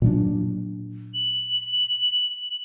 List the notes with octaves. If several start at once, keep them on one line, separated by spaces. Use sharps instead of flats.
A#2 F#3 D4
F#7